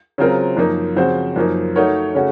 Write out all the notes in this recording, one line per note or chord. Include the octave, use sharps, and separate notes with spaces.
C#3 F#3 C4 F4 A#4
F#2 F3 A#3 D#4
C#3 F3 C4 F#4 C5
F#2 F3 A#3 D#4
A3 D#4 F#4 A#4 C#5
C#3 A3 C#4 F#4